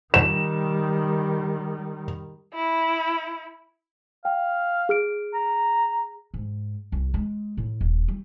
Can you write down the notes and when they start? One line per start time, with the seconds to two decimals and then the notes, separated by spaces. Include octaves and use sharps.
0.14 D#3 G3 E7
2.54 E4
4.25 F5 G5
4.89 G#4 F6 D7
5.34 A#5
6.34 G#2
6.92 C2
7.14 G#3
7.57 A2
7.81 D#1
8.08 G3